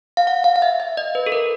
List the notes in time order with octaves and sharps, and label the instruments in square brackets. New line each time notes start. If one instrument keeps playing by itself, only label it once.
[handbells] F5
F#5
F5
F5
E5
E5
D#5
B4
A4
A#4